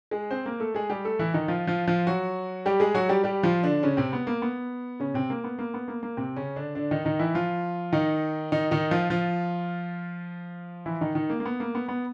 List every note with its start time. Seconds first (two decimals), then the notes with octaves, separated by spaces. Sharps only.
0.11 G#3 G#4
0.31 C4 C5
0.46 A#3 A#4
0.60 A3 A4
0.75 G#3 G#4
0.90 G3 G4
1.05 A3 A4
1.19 E3 E4
1.34 D#3 D#4
1.48 F3 F4
1.67 F3 F4
1.87 F3 F4
2.07 F#3 F#4
2.66 G3 G4
2.80 G#3 G#4
2.94 F#3 F#4
3.09 G3 G4
3.24 G3 G4
3.43 F3 F4
3.63 D3 D4
3.83 C#3 C#4
3.97 C3 C4
4.13 B3
4.27 A#3
4.42 B3
5.00 C#3 C#4
5.14 C3 C4
5.30 A#3
5.44 B3
5.59 A#3
5.74 B3
5.88 A#3
6.03 A#3
6.17 C3 C4
6.36 C#3 C#4
6.56 D3 D4
6.75 D3 D4
6.91 D#3 D#4
7.05 D#3 D#4
7.19 E3 E4
7.35 F3 F4
7.93 D#3 D#4
8.52 D#3 D#4
8.71 D#3 D#4
8.91 F3 F4
9.10 F3 F4
10.86 E3 E4
11.01 D#3 D#4
11.15 D#3 D#4
11.30 A#3
11.40 A#3
11.45 B3
11.60 A#3
11.75 B3
11.88 B3